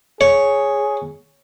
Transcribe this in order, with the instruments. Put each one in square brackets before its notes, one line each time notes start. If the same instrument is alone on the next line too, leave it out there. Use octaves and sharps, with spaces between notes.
[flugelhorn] G#4 [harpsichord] C#5